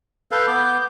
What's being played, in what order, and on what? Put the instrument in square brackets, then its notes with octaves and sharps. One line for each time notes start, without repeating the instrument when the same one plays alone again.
[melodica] A4 B4 F5 [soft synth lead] G6
[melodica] B3 D6